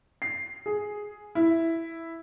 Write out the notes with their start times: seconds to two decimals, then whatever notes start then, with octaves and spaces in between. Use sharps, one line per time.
0.22 C7
0.66 G#4
1.35 E4